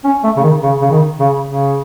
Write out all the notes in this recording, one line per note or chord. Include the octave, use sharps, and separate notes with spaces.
C#4
A3
C#3
D#3
C#3
C#3
D#3
C#3
C#3